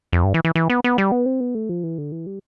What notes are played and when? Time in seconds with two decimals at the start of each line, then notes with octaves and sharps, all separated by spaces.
0.13 F2
0.24 G2
0.34 E3
0.45 E3
0.55 E3
0.70 B3
0.84 B3
0.98 G3
1.12 B3
1.26 C4
1.40 B3
1.55 A3
1.69 F3
1.83 E3
1.98 D3
2.12 E3
2.26 G3